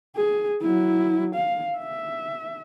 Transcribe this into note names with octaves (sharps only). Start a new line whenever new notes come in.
G#4
F#3 E4
F5
E5